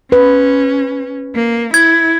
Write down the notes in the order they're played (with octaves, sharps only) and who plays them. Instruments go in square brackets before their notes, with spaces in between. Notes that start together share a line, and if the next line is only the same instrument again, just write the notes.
[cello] C#4 [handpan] B4
[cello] A#3
[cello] E4 [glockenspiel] G#6